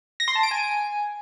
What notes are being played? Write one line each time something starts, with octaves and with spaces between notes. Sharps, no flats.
A#6
C6
A5
D7
G#5